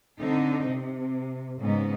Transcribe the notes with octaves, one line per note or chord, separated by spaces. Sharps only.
D3 C4 D#4
C3
G#2 C#3 B3 D#4